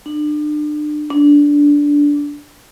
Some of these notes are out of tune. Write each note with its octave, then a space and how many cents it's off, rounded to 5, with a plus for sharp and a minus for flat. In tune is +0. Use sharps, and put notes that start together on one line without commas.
D4 +35
D4 -15